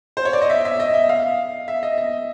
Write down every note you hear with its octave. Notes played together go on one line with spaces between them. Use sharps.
C5
C#5
D5
D#5
E5
E5
D#5
E5
F5
E5
D#5
D#5